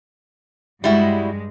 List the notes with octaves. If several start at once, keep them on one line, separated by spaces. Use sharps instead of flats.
G2 G3 G#3 E4 F#4